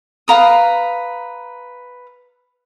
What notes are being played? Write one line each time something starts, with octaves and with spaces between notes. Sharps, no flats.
B4 F5 A#5 D#6